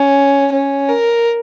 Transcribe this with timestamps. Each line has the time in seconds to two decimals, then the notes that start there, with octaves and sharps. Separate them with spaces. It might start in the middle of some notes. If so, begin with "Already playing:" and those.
Already playing: C#4
0.52 C#4
0.89 A#4